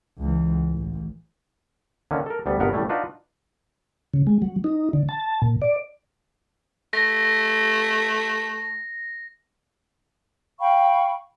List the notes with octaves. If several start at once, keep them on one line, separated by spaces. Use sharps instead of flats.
C#2 E3
A1
D3 D#3 A#3 C#4
A4 A#4
D2 G3 B3
G1 G2 B2 B3 A#4 F#5
A1 B2 G3 A3 C#5
D4 D#4 F4 F#4 B4
C#3
G#3
F#3
D#4
D3
A5
A#2
D5
A3 A#6
F5 G5 B5 C#6